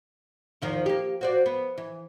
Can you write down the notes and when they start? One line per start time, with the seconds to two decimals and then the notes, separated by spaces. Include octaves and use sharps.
0.62 E2 D#3 F3
0.86 A#3 G4
1.21 F#4 C5 D5
1.46 B3
1.78 E3